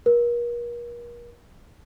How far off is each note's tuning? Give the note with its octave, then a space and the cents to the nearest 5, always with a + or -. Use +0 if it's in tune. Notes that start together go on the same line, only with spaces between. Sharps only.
A#4 +40